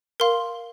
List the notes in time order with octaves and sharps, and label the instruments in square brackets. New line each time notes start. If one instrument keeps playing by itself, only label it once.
[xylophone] A#4 F5 C6